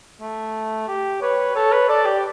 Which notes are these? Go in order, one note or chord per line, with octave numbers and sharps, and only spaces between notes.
A3
G4
B4 C#5
A4 C#5
B4
A4 D5
G4